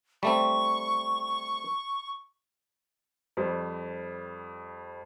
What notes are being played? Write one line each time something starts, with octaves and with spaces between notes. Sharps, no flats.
G3 A3 C4 C#6
F2 G3 C5